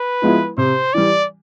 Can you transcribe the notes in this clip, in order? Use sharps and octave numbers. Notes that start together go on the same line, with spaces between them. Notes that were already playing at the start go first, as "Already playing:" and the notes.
Already playing: B4
F3 G#3 B3 E4
C3 C5
E3 G3 D5